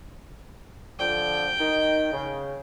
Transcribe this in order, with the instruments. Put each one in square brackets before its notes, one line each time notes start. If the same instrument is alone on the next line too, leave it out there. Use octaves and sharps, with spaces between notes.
[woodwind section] D3 F3 [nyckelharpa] G5
[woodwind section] D#3 D#4
C#3